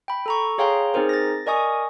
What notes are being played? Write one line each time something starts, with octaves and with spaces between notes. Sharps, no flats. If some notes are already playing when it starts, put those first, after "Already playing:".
G5 B5
A4 A#5 C#6
G#4 C#5 F5 G5 A#5 C6
C4 D#4 G#4 A#4 C5
A6 A#6
A#4 D5 D#5 G#5 C#6 D#6